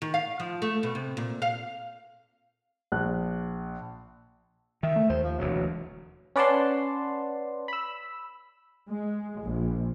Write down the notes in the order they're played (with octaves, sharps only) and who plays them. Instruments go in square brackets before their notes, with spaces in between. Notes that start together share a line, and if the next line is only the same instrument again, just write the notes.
[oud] D#3
F5
F3
A3
B2
C3
A#2
F5
[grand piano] A#1 F#6
[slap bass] D#3 [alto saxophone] E5
[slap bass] A3
[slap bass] D#2 [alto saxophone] C5
[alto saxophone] F3
[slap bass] E1 D2 [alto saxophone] F#3
[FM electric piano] C#4 B4 D5 F#5 A5 C6
B5 E6
[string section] G#3
A#1